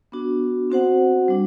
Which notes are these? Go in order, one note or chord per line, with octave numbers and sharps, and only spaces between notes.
B3 D4 F#4
C4 F#4 C5 F#5
G3 D4